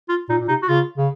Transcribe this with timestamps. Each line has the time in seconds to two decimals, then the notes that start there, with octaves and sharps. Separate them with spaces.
0.09 F4
0.29 A#2 D#4
0.40 A#2
0.48 C3 D#4
0.62 F#4
0.68 C#3 F4
0.98 C#3